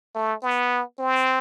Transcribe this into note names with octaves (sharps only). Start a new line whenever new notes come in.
A3
B3
C4